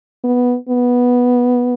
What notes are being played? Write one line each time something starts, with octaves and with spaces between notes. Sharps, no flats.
B3
B3